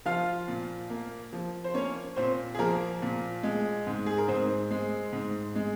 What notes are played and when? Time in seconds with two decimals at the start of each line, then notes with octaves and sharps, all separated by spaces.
0.05 F3 F4 F5
0.48 A#2
0.90 A#3
1.33 F3
1.64 C5
1.74 A#3 C#4 C#5
2.16 A#2 C4 C5
2.55 G#4
2.59 F3 A#3 A#4
3.02 A#2
3.43 G#3
3.87 G#2
4.06 G#4
4.18 A#4
4.28 G#2 C4 C5
4.71 G#3
5.13 G#2
5.55 G#3